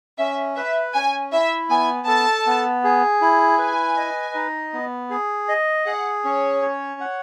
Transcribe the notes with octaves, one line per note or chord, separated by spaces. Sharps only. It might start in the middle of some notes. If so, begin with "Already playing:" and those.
C#4 E5
B4 E5
C#4 G#5
E4 E5
B3 G#5
A4 A5
B3
G#4
E4
B4 G#5
D#5
D#4
B3
G#4
D#5
G#4 F#5
C#4 C#5
C#5
F#5